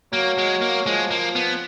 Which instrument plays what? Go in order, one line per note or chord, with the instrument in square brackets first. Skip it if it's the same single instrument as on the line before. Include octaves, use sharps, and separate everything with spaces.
[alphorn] F#3 [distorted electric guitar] A#3
[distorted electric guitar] G#3
A#3
[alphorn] F3 [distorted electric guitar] G#3
[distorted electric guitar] A#3
B3